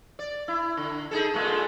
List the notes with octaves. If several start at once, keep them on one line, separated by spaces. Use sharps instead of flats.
D5
E4
D3
D#4 G#4 A4
A#2 G#3 A3